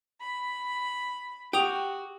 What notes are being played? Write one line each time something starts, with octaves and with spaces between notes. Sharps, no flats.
B5
F#4 G4 G5 D#6 F7